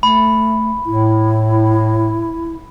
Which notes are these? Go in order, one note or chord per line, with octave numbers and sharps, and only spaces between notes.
A3 B5
A2 E4